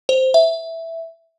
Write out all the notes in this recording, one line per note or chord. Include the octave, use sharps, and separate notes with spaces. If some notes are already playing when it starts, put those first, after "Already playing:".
C5
E5